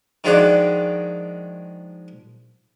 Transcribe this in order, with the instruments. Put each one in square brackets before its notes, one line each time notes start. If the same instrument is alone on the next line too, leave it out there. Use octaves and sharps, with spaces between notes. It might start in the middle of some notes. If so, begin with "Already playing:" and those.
[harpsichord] D#3 F3 G#3 D4 F#4 D5